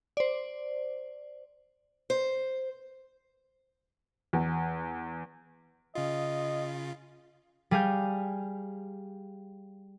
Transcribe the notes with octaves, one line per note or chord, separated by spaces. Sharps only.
C5 D5
C5
E2
C#3 F4 D#5
G3 G#4 F5 G#5 G6